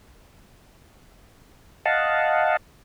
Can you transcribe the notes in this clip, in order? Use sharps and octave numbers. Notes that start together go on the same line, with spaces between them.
D#5 F5 F#5 A5